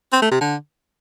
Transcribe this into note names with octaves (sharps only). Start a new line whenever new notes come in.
C4
A3
C3
D3